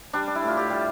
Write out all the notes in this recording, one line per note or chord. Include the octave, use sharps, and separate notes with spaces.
G3 D4
D4
E4
A2
F4
A2 G4
G3